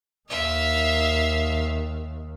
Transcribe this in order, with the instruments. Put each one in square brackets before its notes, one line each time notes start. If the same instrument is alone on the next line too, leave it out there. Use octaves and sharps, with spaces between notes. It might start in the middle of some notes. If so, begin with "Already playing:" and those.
[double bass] D#2 D#3 [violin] E5 F5